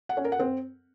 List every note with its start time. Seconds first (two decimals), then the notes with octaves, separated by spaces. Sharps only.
0.09 F#5
0.17 C#4
0.24 A#4
0.32 F#5
0.40 C4